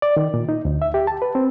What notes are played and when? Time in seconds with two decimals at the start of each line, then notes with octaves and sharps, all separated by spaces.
0.02 D5
0.17 D#3
0.34 A#2
0.49 D#4
0.65 D2
0.82 E5
0.94 G4
1.07 A5
1.22 B4
1.35 C4